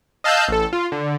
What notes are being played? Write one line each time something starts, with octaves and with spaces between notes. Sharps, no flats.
D#5 F5 A5 E6 F#6 G6
A1 A4
F4
D3